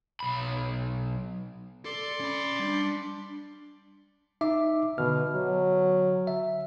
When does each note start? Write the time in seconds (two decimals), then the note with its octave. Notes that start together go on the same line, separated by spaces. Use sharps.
0.20 B1 B5
1.85 A4 D5 C6
2.20 C#4 B5
2.59 G3 D4
4.41 D#4 E5 D6
4.98 B2 D3 F6
5.35 F#3
6.27 E5